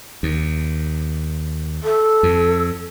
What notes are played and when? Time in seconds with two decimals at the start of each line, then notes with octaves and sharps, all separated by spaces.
0.23 D#2
1.83 A4
2.23 F2